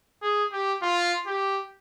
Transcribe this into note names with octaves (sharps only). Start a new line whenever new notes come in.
G#4
G4
F4
G4